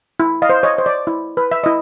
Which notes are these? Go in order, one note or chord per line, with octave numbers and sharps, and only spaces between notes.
E4
D#5 F5
C5
C#5 D#5
C5
D5
E4
B4
E5
E4 D#5